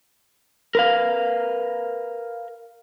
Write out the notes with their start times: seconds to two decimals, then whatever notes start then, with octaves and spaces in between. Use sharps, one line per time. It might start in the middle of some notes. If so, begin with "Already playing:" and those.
0.75 A#4 B4 F5